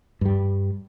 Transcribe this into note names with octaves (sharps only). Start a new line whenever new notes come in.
G2 G3